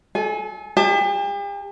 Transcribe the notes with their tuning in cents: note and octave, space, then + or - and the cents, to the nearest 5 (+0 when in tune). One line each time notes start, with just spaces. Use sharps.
A4 -35 G#5 +0
G4 +45 A5 +0